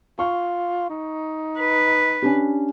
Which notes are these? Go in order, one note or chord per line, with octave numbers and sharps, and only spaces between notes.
F4 C#6
D#4
B4
C#4 D4 G4